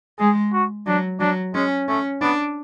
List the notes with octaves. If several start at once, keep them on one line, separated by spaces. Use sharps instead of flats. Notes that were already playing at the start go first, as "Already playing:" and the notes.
G#3 G#4
F#4
F#3 D4
F#3 D4
G#3 C#4
A3 C#4
B3 D4